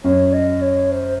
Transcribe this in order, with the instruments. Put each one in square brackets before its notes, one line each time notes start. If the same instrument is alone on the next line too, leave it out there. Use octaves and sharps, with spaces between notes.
[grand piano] F#2 [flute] C#5
[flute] D#5
C#5
C5